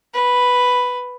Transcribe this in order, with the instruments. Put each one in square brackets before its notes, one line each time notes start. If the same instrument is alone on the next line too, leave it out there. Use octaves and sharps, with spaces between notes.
[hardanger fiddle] B4